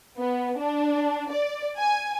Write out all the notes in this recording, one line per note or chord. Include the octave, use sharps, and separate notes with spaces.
B3
D4
D5
G#5